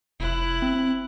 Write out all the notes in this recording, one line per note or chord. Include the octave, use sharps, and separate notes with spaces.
F1 E4 F#6
C4